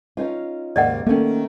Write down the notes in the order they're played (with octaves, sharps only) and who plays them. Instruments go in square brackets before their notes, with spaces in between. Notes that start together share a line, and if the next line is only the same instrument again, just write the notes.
[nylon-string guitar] C#4 D#4 F4
[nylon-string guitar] D#2 G#2 C#3 [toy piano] D5 D#5 F#5
[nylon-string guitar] D#3 A3 [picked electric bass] A#3 C#4